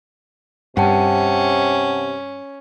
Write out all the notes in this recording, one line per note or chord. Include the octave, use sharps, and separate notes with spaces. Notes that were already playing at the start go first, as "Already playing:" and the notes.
G2 C3 C#4 F#5 G5 A5